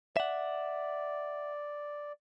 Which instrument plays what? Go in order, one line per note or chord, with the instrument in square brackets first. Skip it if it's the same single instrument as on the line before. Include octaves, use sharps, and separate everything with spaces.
[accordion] D5 [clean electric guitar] E5 F#5